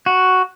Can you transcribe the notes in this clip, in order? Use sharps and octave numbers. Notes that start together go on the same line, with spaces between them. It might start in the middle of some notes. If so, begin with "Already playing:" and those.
F#4